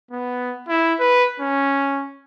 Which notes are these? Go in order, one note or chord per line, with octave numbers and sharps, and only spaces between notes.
B3
E4
B4
C#4